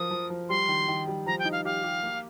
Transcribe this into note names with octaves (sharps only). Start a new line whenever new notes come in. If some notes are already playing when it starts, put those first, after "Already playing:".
Already playing: F3 A#4 D#6
F3
F3
G3 C6
D#3
D#3
G3
F3 A#5
G5
D#4
F5
G4 F5
G4
A#3